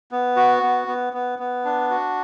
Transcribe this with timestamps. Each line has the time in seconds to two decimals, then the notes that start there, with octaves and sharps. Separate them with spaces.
0.11 B3
0.36 F#4
0.63 B3
0.87 B3
1.13 B3
1.39 B3
1.65 D4
1.90 F#4